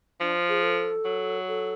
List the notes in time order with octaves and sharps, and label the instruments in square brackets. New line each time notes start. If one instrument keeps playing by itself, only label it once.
[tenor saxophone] F3 [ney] D4
[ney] G#4
A4
[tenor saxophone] F#3
[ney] A4